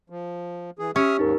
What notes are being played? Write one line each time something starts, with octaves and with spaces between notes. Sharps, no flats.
F3
E3 G#4
C#4 G4 E5 D#6 F6
D#2 G#2 D#4 A#4